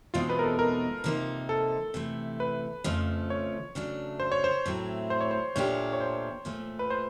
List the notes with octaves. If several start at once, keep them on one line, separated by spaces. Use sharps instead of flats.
E2 B2 G#3 C4 D#4 F4
B4
A#4
A4
A#4
C3 F3 A#3 D#4
A4
C3 E3 A3
B4
F2 C#3 F3 A3
C#5
C#3 F#3 A3 D4
C5
C#5
C5
A2 F#3 A3 C4 E4
C5
C#5
C5
A#2 F3 A3 D4 G4 C#5
C#5
C5
A#2 F3 A3
B4
C5